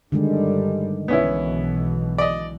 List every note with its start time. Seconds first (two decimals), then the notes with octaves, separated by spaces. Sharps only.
0.12 G2 D3 D#3 G3 G#3
1.08 B1 B2 E3 B3 C#4 E4
2.18 D5 D#5